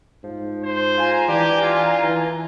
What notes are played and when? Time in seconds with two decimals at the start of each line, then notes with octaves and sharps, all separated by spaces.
0.24 G#2 F3
0.64 C5
0.97 F4 G#5 A#5
1.28 E3 D4 G4
1.62 F4
2.03 E3